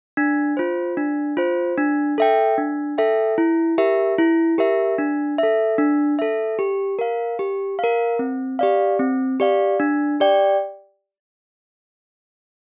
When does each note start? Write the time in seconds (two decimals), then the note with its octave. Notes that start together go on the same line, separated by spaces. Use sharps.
0.17 D4
0.57 F4 C5
0.97 D4
1.37 F4 C5
1.78 D4
2.18 A4 E5 G5
2.58 D4
2.98 A4 E5 G5
3.38 E4
3.78 G4 A#4 E5
4.18 E4
4.58 G4 A#4 E5
4.98 D4
5.38 A4 E5
5.78 D4
6.19 A4 E5
6.59 G4
6.99 A#4 F5
7.39 G4
7.79 A#4 F5
8.19 C4
8.59 G4 D5 F5
8.99 C4
9.40 G4 D5 F5
9.80 D4
10.20 G4 D5 G5